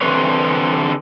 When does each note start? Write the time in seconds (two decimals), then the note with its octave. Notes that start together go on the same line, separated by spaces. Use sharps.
0.01 D3 E3 C4 B4 C#5